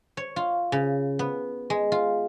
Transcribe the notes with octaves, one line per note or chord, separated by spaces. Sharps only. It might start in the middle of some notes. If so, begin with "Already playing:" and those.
C#5
F4
C#3
B3
G#3
F4